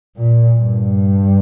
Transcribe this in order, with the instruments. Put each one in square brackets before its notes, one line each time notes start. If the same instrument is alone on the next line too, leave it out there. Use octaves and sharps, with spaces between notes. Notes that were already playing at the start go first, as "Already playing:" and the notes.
[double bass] A#2
G2